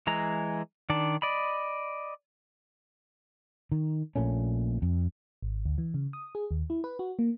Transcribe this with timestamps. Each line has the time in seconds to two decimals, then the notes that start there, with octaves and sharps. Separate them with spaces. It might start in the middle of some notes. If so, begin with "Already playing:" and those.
0.07 E3 G#3 A#5
0.90 D#3 D4 D5
1.22 D5 D#5 B5
3.72 D#3
4.16 A#1 A#2 A3 C#4
4.82 F2
5.42 G#1
5.66 D2
5.78 E3
5.94 C#3
6.13 D#6
6.35 G#4
6.51 D#2
6.70 E4
6.84 B4
6.99 F#4
7.19 A#3